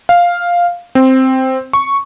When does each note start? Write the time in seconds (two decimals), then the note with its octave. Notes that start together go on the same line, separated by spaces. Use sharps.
0.09 F5
0.95 C4
1.73 C#6